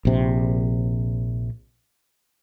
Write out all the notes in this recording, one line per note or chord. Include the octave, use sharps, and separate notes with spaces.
A#1 C3